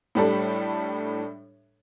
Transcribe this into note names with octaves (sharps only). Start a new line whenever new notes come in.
A2 G3 D4 A4